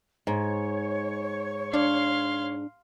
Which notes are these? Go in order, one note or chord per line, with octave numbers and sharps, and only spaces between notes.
G#2 C#5
D4 F5 C6